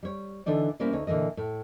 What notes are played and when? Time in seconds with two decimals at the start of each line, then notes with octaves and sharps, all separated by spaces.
0.03 G3 C#5
0.46 D3 E3 D4 D#4 D5
0.79 C3 G3 A#3 B3 C#4 E4
0.93 D2 D#4 C#5
1.07 A#2 D3 E3 A#3 D#5
1.37 A2